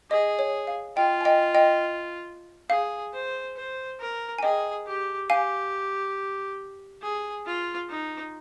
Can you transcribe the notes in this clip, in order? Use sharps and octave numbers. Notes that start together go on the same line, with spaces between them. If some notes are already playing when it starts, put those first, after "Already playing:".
G#4 D#5
C#5
F5
F4 D#5 G5
G#5
D#5 G5
D#5 G5
G#4 F5
C5
C5
A#4
G#5
G#4 D#5 G5
G4
G4 F5 G#5
G#4
F4
D#4